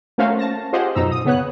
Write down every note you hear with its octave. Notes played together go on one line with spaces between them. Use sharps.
A3 A#3 C#4 F#4 C5 F5
A5 A#6
F4 G4 G#4 C5 D#5 F#5
F#2 B2 D#4 A#5 E6
D#6
C#3 B3 C#5 F#6